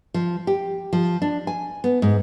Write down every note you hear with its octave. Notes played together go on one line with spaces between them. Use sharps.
F3
G4
F3
D4
G#5
B3
G#2